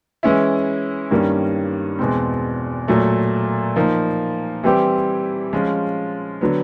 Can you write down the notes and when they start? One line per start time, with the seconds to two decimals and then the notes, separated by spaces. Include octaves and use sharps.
0.23 E3 G#3 C#4 E4
1.11 G2 D#3 G3 A#3 C#4
1.99 E2 B2 G#3 C4
2.88 A#2 F#3 A3
3.76 F3 A#3 D#4
4.64 E3 G3 C4 E4 G4
5.53 F3 G#3 C#4 F4
6.41 D3 F#3 B3